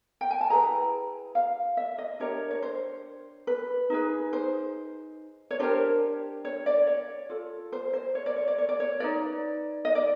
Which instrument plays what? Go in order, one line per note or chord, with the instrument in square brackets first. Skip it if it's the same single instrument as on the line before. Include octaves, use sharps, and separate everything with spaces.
[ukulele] G5
G#5
A5
E4 G#4 B4 A#5
F5
E5
D#5
D4 G4 A#4 C#5
C#5
C5
B4
D#4 G#4 B4
C5
C#5
D4 G4 A#4 C5
C#5
D5
C#5
F4 A4
C5
C5
C#5
D5
C#5
D5
C#5
D5
C#5
D#4 F#4 B4 D5
D#5
D5